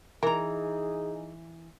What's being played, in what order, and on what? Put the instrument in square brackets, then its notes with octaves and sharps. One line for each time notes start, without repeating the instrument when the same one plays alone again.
[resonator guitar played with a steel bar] E3 A#5 [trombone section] D#4 G#4 [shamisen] A#4